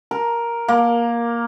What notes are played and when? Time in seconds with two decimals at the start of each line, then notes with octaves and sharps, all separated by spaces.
0.11 A#4
0.68 A#3